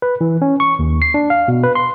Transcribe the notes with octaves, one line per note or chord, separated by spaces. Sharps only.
B4
E3
C#4
C#6
D#2
C7
D4
F5
B2
B4
C6